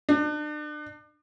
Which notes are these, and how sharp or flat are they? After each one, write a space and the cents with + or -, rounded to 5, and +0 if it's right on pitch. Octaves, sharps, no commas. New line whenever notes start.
D4 +35